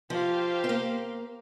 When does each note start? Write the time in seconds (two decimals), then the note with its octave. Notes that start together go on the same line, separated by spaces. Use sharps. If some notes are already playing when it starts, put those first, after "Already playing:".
0.10 F3 G4 C5 F5
0.64 C4
0.69 A#3